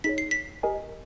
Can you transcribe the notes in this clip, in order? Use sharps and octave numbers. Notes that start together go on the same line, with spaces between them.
D#4 G#4 C#5 B6
C7
B6
G4 A#4 D#5 G#5